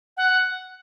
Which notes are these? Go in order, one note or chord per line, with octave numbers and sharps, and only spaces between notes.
F#5